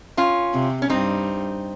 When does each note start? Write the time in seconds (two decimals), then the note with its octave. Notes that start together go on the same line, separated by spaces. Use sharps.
0.17 C#4 F4
0.54 C3
0.82 C#4
0.90 G2 C4 D#4